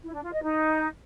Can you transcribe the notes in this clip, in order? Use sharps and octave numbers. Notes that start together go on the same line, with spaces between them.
E4
D4
F4
D#5
D#4